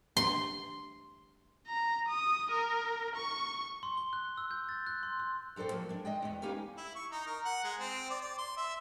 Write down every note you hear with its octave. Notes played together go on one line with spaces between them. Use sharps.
C6
A#5
D#6
A#4
C#6
C6
G7
F#6
E6
G6
A6
F#6
C6
C6
F#2 F#3 A4 C5 G5
F3 F#3 A#3
G#3 D4
G#3 D#5 G5
E2 B3
C#4 D#4 G4 B4 F5 G#5
E4
C#6
D#4
A#4
F#5
G#3
C4
D5
D5
C6
E5